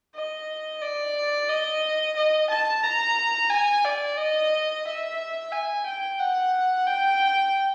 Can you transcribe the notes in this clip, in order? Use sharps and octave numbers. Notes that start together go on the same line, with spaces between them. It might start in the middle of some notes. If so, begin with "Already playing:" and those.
D#5
D5
D#5
D#5
A5
A#5
G#5
D5
D#5
E5
G#5
G5
F#5
G5